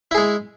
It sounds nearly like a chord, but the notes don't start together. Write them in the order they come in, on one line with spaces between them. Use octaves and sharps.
E4 G#4 G#3